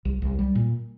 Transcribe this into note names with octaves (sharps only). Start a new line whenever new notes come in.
C2
C2
G3
A#2